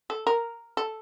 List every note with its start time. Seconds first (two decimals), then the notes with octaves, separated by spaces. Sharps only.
0.10 A4
0.27 A#4
0.77 A4